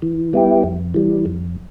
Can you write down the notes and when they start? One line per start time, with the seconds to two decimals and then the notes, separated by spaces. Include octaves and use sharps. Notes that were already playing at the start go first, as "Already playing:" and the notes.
0.02 E3
0.33 G3 B3 E4 G4
0.64 F2
0.94 E3 G3
1.26 F2